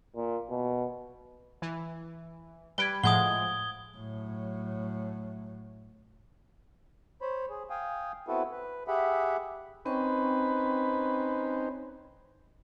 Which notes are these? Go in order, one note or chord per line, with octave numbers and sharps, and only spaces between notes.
A#2
B2
E3
G3 B4 G#6 D7 G7
A2 F3 G#3 F#5 D#6 G#6 G7
A2 F#3
C5 C#5 B5
G#4
F5 G5 G#5 D#6
B3 C4 E4 F#4 A4 B4
B4
G4 G#4 E5 F#5 B5
C4 C#4 D#4 B4 C5 G5 C#6